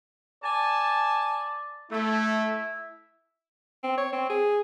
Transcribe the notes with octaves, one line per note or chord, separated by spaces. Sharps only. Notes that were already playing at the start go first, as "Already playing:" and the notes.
D5 G#5 A5
A3 E4
C4
C#5
C4
G#4